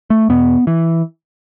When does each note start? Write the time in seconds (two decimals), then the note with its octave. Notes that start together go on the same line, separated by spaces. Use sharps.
0.10 A3
0.29 E2 B2 B3
0.67 E3